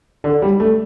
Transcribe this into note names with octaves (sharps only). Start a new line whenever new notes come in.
D3
G3
A3